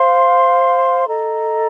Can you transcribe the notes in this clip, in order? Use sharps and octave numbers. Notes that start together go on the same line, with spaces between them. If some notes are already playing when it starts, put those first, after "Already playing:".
Already playing: C5 F5 C6
A4 D#5 A#5